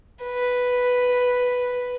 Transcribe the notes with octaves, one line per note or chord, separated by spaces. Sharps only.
B4